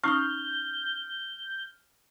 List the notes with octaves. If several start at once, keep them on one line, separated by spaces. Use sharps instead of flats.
C#4 D#4 C#6 D#6 F6 G6